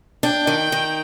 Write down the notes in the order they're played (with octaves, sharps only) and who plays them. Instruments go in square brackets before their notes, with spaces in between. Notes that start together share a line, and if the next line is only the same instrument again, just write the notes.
[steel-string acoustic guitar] D4 [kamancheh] G5
[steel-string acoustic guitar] D#3
D#3